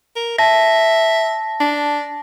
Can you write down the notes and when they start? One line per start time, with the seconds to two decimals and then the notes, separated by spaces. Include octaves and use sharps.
0.16 A#4
0.39 E5 A5 A#6
1.60 D4